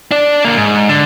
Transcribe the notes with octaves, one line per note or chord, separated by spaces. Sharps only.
D4 D5
D3 A#3
G#2
D3